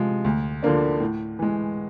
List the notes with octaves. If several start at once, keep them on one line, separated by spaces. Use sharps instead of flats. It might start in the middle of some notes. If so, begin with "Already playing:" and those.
Already playing: C3 F3 G#3
D2
D3 F3 A#3 D4
A2
E3 G#3